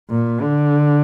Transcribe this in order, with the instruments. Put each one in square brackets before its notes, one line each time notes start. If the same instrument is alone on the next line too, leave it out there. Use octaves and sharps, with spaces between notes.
[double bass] A#2
D3